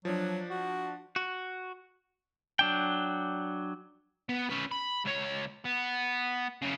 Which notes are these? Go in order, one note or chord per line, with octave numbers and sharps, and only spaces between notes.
F3 F#3 D4
F#4
F#4
F#3 D4 G5
B3
C#4 B4
B5
C#2 C#5
B3
F#2 C#3